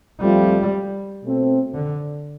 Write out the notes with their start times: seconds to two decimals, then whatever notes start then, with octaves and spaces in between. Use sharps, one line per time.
0.21 F3 G3 A3 C4 F4
1.24 B2 A3 C4
1.75 D3